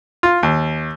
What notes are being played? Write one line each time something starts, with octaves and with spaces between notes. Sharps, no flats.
F4
D#2